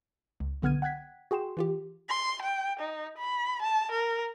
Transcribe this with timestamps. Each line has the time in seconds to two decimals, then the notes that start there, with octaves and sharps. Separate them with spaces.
0.40 C#2
0.62 B1 D3 B3 F6 G#6 D#7
0.82 F#5 G5 F#6 G#6 B6
1.31 F#4 G#4 G5 C6 E7
1.57 E3 F4 G4
2.09 C6
2.42 G5
2.80 D#4
3.18 B5
3.62 A5
3.92 A#4